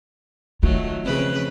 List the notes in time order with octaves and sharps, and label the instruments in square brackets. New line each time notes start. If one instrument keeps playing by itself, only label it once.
[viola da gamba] D#3 F#3 A3 [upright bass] F4
[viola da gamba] F2 C#3 B4